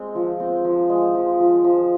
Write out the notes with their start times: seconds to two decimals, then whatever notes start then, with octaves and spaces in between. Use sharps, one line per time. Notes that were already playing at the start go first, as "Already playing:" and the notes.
Already playing: G#3 C4
0.15 F3
0.40 C4
0.64 F3
0.89 G#3
1.15 F3
1.40 F3
1.64 F3